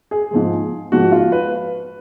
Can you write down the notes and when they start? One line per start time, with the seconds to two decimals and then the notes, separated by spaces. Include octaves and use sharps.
0.11 G#4
0.31 G#2 F3 G#3
0.92 G#2 F3 G#3 F#4
1.12 F4
1.32 B4